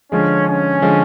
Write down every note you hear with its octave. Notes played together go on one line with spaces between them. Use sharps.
D3 F3 G#3 C#4
C#4
D3 F3 G#3